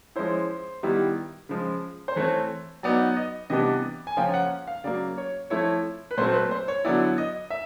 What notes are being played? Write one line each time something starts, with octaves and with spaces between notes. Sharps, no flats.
F3 G#3 C#4 E4 C5
D#3 G3 B3 E4
C#3 F3 G#3
C5
E3 A3 C4 C#5
F#3 B3 D#4 D5
D#5
C3 E3 G3 B3 D4 D#5
G#5
C#3 F3 A#3 C#4 F4 G5
F#5
F5
C#3 F#3 A#3 D5
C#5
F3 A3 C4 E4 C#5
B4
A#2 F#3 A3 C4 C5
B4
C5
C#5
D3 F#3 B3 E4 D5
D#5
E5